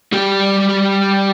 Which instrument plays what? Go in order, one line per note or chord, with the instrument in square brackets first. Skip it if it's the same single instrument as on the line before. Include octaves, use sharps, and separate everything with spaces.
[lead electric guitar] G3 G4